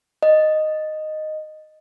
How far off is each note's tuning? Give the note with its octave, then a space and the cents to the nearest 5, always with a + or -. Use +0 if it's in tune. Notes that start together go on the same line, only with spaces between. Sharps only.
D#5 -5